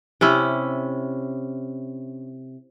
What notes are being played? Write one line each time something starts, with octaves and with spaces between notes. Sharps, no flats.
C3 C#4 E4